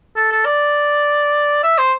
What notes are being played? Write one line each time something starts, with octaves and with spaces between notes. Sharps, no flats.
A4
A4
D5
E5
C5